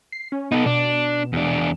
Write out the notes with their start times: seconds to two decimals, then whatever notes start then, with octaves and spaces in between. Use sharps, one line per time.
0.12 C7
0.32 C#4
0.52 B3 D#4 A4
0.66 B2 D4
1.33 E2 D4